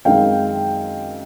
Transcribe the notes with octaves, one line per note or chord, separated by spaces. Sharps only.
F#2 D#3 G#3 C4 D#4 F5 G5